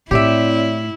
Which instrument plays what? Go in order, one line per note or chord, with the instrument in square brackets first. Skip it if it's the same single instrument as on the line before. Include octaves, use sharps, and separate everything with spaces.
[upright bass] A2 [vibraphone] C4 C#5 D5 [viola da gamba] E4 [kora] G4 E5